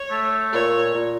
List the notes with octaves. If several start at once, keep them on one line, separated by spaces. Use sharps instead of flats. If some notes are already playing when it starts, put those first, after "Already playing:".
Already playing: C#5
A3
A#2 C#5
A#2